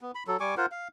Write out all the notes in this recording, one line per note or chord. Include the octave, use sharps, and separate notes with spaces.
B3
B5
F#3 A4
G3 G#5 C#6 D6
F4 A#4 C5 F#5
F5